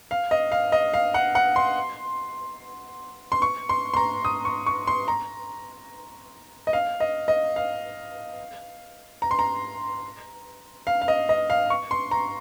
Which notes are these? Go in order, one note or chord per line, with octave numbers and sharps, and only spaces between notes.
F5
D#5
F5
D#5
F5
F#5
F#5
C6
C6
C#6
C6
C6
A#5
D#6
C#6
C#6
C6
A#5
D#5
F5
D#5
D#5
F5
A#5
C6
A#5
F5
F5
D#5
D#5
F5
C#6
C6
A#5